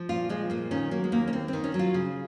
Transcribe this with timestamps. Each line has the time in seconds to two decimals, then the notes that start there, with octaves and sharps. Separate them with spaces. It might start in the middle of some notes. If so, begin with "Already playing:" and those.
Already playing: F3
0.09 A#2 F4
0.29 F3 G#3
0.50 A#2 A#3
0.71 D#3 C#4
0.91 F#3 A#3
1.04 G#3
1.12 D#2 A#3
1.28 C#4
1.33 D#2 C4
1.48 C4
1.53 D#3
1.64 C#4
1.74 F#3
1.79 F4
1.94 C#3